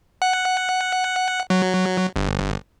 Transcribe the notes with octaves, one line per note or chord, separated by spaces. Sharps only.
F#5
F#3
G1